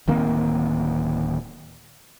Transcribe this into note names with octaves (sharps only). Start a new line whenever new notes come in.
D1 D#3 A#3 C4